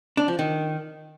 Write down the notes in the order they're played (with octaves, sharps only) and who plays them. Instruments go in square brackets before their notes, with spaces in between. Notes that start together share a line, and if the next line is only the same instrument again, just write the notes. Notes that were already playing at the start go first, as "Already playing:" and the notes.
[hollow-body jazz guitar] D4
F3
D#3